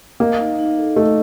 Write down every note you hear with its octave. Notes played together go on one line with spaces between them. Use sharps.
A#3 D#5
D#4
D#4
A4
A3 D#5